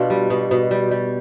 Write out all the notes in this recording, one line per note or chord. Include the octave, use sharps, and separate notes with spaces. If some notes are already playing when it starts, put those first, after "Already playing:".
Already playing: B2 D4 F4 G4
G3
B2
B2
G3
G3